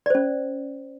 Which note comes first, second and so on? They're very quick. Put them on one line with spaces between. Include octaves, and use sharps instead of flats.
D5 C5 C#4